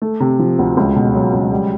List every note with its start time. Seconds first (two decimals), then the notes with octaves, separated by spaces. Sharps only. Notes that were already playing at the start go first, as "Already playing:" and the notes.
0.02 A3
0.20 C3
0.39 F3
0.59 D2
0.77 C#2
0.96 B2
1.15 F#3
1.33 C#2
1.52 G3